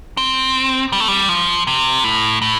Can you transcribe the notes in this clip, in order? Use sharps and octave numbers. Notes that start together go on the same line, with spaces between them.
C4
G3
A3
G3
F3
C3
A2
A2